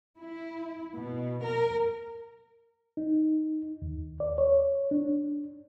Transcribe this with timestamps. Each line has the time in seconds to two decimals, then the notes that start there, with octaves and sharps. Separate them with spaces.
0.18 E4
0.97 B2
1.43 A#4
2.97 D#4
3.82 D#2
4.20 D5
4.38 C#5
4.91 D4